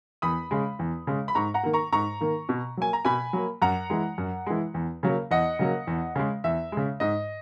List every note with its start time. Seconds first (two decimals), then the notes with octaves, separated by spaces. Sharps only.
0.22 E2 B5 D#6
0.51 C#3 G#3
0.79 E2
1.07 C#3 G#3
1.28 B5
1.35 G#2 A#5 C#6
1.54 F#5 A#5
1.63 D#3 A#3
1.73 A#5 C#6
1.92 G#2 A#5 C#6
2.21 D#3 A#3
2.49 B2
2.77 F#3 A#3 G#5
2.93 A#5
3.05 B2 G#5 B5
3.33 F#3 A#3
3.62 F#2 F#5 A#5
3.90 E3 G#3
4.18 F#2
4.46 E3 G#3
4.74 E2
5.03 C#3 F#3 A#3
5.31 E2 D#5 F#5
5.59 C#3 F#3 A#3
5.87 E2
6.16 C#3 G#3
6.44 E2 E5
6.72 C#3 G#3
7.00 G#2 D#5